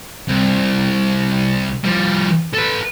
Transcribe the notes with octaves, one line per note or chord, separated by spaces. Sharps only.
C2
F3 G3
A4 B4